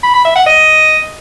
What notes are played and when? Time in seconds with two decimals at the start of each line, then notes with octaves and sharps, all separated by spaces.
0.03 B5
0.14 B5
0.25 E5
0.36 F#5
0.46 D#5